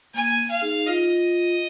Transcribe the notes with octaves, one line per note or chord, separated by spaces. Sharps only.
A#3 G#5
F5
D#4 G#4
F4 D#5